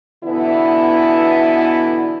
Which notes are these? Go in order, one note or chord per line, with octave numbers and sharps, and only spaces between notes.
B2 D3 E3 B3 E4